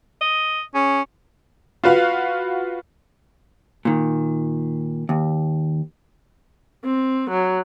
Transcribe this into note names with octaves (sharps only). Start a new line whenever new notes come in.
D#5
C#4 G#4
F4 F#4 B4 F5
A#2 D#3
D#2
C4
F#3